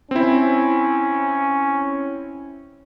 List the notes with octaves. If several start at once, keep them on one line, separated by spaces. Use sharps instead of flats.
C4 C#4 E4